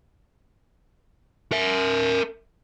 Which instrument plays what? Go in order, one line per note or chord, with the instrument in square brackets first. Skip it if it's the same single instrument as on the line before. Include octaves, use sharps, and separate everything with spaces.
[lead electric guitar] A#4 E5